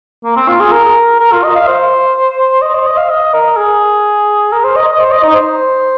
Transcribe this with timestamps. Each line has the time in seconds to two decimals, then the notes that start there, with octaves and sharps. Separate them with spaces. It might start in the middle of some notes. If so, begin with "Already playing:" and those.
0.25 A#3
0.36 C4
0.48 F4
0.60 G#4
0.72 A#4
1.20 A#4
1.32 F4
1.44 D#5
1.55 F5
1.67 C5
2.62 D#5
2.75 C5
2.86 D#5
2.97 F5
3.10 D#5
3.34 A#4
3.57 G#4
4.52 A#4
4.65 C5
4.76 D#5
4.87 D#5
5.00 C5
5.12 D#5
5.23 D#4
5.35 C5